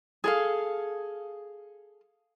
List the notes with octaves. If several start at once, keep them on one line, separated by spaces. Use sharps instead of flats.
G#4 A4 F5